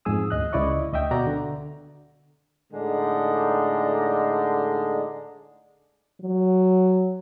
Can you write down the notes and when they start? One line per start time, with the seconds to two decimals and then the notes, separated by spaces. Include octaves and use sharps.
0.05 F2 G#2 G#4 D#6 E6
0.31 D2 D#5 F#6
0.53 C#2 C#3 E4 D5 D#5 C#6
0.93 D2 D#5 E5 G5
1.11 B2 F#4 D5 A#5
1.27 D3
2.73 A2 D3 G#3 D#4 D5
6.21 F#3